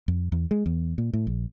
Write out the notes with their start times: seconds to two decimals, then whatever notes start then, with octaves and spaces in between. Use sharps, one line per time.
0.08 F2
0.32 E2
0.51 G#3
0.66 E2
0.98 A#2
1.13 A2
1.27 A#1